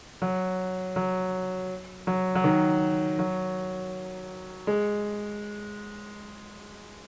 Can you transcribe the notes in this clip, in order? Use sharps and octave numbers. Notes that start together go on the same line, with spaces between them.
F#3
F#3
F#3
F#3
D#3
F#3
G#3